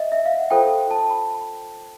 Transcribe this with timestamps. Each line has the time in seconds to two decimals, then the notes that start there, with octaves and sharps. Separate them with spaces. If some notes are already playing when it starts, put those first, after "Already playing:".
Already playing: D#5 E5
0.12 E5
0.25 F5
0.38 F#5
0.50 F4 A4 C5 G5
0.91 A5
1.10 B5